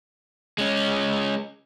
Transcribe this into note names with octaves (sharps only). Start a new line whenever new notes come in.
G#3 C#4